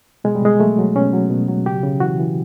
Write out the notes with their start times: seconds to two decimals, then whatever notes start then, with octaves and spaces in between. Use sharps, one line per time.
0.24 B2 G#3
0.35 G3
0.42 B2 G#3
0.60 F#3 A3
0.78 F#3
0.96 B2 C#4
1.13 F#3
1.30 B2
1.48 F#3
1.66 C#3 G4
1.83 C#3
2.00 E3 F#4
2.19 E3